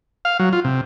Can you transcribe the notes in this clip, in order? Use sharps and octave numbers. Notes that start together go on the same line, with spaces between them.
F5
F#3
F4
C3